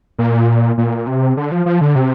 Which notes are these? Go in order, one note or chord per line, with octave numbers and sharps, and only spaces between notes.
A#2
A#2
C3
D3
F3
F3
D3
C3